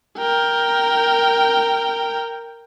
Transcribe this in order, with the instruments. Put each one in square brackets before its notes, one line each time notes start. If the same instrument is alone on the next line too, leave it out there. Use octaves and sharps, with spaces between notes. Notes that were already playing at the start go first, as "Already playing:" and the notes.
[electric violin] A#4 G5